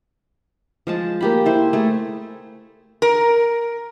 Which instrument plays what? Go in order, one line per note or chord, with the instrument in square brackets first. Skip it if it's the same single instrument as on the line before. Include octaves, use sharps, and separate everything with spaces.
[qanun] F3 G#3 A5
A#3 G4 B5
E4 C5
A3 G#4
[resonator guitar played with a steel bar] A#4